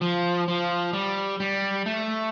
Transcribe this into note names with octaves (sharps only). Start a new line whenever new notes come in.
F3
F3
G3
G3
A3